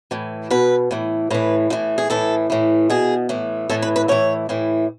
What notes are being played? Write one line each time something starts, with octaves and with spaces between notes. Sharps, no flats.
A2 E3
B2 B4
A2 E3
A2 E3 B4
A2 E3
G#4
A2 E3 A4
A2 E3
B2 G#4
A2 E3
A2 E3 A4
B4
B4
A2 E3 C#5
A2 E3